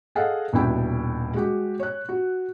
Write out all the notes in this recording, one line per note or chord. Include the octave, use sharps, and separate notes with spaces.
G#4 A4 D#5 F5 F#5
D#1 B2 D4 E4 G5
G#3 F#4 G4
C#5 F#6
F#4